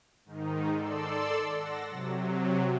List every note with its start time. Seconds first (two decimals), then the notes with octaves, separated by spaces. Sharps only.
0.25 G#2 D#3 D#4
0.74 A4 D5 C6 E6
1.54 F#5 A6 A#6
1.88 C3 F#3